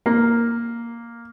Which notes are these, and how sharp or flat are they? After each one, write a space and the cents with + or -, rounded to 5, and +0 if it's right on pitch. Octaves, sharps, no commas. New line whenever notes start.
A#3 +0